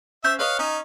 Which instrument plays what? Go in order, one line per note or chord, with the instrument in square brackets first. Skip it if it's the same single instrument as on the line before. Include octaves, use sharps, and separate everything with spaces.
[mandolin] C#4 C5 G6 [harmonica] E5
[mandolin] B4 C#5 D#5 [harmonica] F5
[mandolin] C#4 [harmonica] D#4